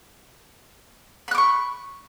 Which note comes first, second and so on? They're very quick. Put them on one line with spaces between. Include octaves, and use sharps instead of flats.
B5 F#6 D6 C#6